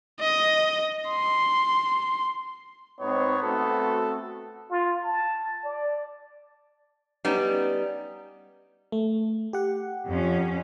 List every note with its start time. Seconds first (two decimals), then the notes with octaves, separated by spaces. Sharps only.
0.20 D#5
1.09 C6
3.00 G#2 B3 C4 D#4 C#5
3.43 A3 C4 F#4 A4
4.71 F4
5.04 A5
5.64 D5
7.25 G3 B3 C#4 D#4
8.92 A3
9.53 G4 F#5
10.06 F2 C#4